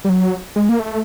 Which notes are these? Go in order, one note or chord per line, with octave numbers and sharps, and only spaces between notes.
G3
F#3
G#3
A#3
A3